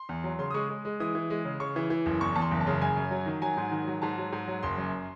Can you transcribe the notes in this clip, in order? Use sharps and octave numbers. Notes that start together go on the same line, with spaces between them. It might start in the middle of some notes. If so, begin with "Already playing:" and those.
Already playing: C6
E2
F#3
C#3 C6
D#6
G#3 C#6
G#3
G#3
E3 D#6
E3
G#3
C#3
C#3 C#6
E3
E3
F#1
E2 C#6
E2 A5
C6
F#1
A5
C#3
F#2 G#5
F#2
F#3
D#3
F#3 G#5
G#2
D#3
F#3
G#2 A5
F#3
G#2
F#3
F#1 C6
F#2